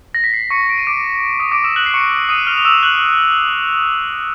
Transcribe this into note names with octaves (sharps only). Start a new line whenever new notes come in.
A#6
B6
C7
C#6 C#7
D7
D#7
D6 D7
D#6 D#7
D6 D7
E6 E7
F#6 F#7
C7
C#6 C#7
D#6 D#7
F6 F7
F7
E6 E7
F#6 F#7